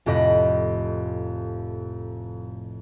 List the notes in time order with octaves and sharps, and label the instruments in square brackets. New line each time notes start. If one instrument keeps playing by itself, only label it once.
[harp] F1 F2 A2 G4 D#5 B5